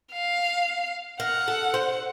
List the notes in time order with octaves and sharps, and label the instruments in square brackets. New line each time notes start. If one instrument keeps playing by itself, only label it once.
[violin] F5
[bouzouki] A#4 [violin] F#5
[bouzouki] A4
C5